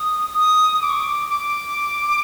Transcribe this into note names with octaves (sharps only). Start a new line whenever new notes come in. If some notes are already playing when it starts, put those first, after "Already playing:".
Already playing: D#6
D#6
D6
C#6
D6
D6